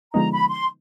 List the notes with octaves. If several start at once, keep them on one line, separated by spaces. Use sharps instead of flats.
D3 F3 G#3 B3 D#4 A#5
B5
C6